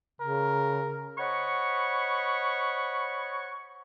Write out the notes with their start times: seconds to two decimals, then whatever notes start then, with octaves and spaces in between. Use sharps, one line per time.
0.21 C#3 A#4
1.18 C5 C#5 D#5 F#5 B5 C#6